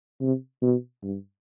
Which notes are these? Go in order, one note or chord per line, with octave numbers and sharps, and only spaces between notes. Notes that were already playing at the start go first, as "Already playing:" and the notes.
C3
B2
G2